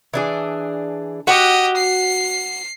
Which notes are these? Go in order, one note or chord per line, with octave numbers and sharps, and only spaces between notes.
E3 D4 G#4
F#4 G4 D#5 F#5
C7